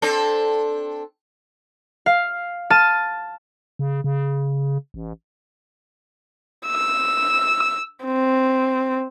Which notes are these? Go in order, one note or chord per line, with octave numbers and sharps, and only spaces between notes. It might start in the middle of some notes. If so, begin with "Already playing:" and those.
C4 D4 A4
F5
A5 F6 A6 D#7
C#3
C#3
A1
E6
C4